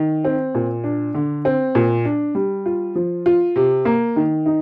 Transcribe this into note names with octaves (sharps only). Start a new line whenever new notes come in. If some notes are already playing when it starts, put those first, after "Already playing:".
Already playing: D#3
C4
A#2
D4
D3
C4
A#2
D4
G3
F4
F3
F4
C3
A#3
D#3
D#4